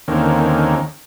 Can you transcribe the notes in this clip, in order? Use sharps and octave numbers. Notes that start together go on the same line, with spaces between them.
D#2 D3 D#3 A#3 C4 C#4